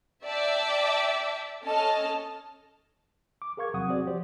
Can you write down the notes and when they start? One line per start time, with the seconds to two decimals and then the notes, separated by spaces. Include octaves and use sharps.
0.24 D5 E5 G5 A5 D6 E6
1.63 C#4 A4 D#5 A5 F6
3.42 D6
3.57 G#4 A#4 F5 C#6 G#6
3.74 E2 C3 F#3 F#5 D#6
3.89 C4 F#4 G#4 C5 D5
4.07 F3 G4 C5 D5